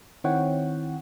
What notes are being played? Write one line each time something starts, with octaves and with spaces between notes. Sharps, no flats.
D#3 C4 E4 C#5 F#5 G5